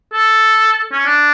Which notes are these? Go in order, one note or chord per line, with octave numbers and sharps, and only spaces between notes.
A4
C#4
D4